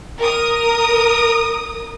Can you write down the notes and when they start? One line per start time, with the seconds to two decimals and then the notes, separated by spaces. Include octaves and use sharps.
0.20 A#4 D#6